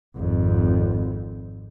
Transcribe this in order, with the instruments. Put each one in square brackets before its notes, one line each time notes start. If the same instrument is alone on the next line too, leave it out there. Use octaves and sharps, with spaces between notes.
[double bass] G#1 F2